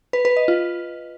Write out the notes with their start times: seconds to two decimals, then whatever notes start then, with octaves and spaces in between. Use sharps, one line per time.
0.13 B4
0.25 B4
0.36 D#5
0.48 F4